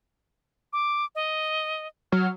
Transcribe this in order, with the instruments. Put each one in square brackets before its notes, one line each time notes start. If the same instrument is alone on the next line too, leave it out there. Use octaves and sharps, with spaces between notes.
[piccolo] D6
D#5
[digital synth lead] F#3 [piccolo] F6